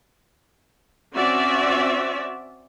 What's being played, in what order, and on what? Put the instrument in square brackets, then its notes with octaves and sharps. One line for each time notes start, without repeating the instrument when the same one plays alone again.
[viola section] C4 C#4 F#4 D5 E5